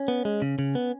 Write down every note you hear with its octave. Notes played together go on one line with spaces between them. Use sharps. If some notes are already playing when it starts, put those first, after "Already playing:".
Already playing: C#4
B3
G#3
C#3
C#3
B3